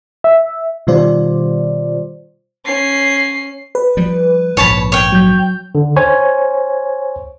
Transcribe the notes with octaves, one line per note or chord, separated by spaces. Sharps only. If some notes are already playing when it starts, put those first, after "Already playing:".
E5
B2 D#3 G3 F4 C5 D5
C#4 C7
B4
F3 G3
A#1 G#2 C#5 A5 B5
C#5 G5
F#3 G6
D3
C5 C#5 G#5